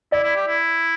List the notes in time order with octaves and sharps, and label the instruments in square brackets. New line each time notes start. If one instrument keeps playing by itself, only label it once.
[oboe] E4 [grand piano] D5
[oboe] E4
G4
E4